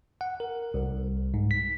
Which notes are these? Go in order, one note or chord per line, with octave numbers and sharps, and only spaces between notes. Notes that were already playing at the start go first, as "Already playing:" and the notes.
F#5
A#4
C2
G#2
B6